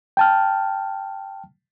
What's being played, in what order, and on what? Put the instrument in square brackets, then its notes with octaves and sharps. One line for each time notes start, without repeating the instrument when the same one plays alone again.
[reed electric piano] G5 A5 F6